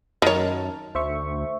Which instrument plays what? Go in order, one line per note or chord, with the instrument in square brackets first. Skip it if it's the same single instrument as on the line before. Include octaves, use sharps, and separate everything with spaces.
[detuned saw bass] F#2 [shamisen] D#3 C#5 [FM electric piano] A#4 A5
[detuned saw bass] D2 [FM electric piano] C5 E5 C#6